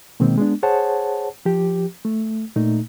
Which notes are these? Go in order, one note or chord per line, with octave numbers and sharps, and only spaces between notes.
B2 D#3 G#3 A#3 C4
G#3 B3 D4
G#4 C5 C#5 F#5 A5
F3 G4
A3
A#2 A3 D#4